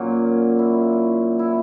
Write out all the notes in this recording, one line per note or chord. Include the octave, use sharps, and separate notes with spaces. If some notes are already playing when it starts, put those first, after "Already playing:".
Already playing: A#2 F#3 A#3 C#4
E4
E4